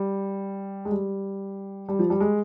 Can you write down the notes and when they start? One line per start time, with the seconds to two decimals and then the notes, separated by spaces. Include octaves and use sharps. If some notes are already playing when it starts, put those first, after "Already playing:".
Already playing: G3
0.85 G#3
0.91 G3
1.89 G3
1.99 F3
2.10 G3
2.20 G#3